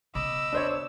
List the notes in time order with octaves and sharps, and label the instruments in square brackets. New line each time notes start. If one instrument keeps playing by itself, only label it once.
[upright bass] C#3 B3 [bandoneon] D#5 B5 D6 [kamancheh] E6
[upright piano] D4 C5 C#5